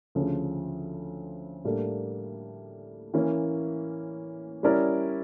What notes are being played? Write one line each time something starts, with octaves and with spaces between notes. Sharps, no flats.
D2 C#3 F3 C#4
A2 G3 A#3 D4 A4
E3 A#3 C#4
G3 C#4 E4 A#4 D5